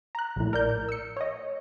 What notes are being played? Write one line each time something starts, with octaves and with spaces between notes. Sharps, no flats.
A#5 F#6
A#1 A2
A#4 D5 G6
E6 C#7
C#5 D#5